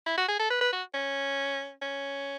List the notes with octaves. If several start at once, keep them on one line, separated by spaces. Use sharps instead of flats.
E4
F#4
G#4
A4
B4
B4
F#4
C#4
C#4